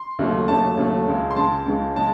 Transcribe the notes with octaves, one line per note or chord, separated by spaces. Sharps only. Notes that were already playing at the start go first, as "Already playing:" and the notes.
Already playing: C6
D#2 C#3 F#3 A3
D#2 C#3 F#3 A3 A5
D#2 C#3 F#3 A3
C#2 C#3 G#3
C6
C#2 C#3 G#3 A5
C#2 C#3 G#3
C#3 G#3 A5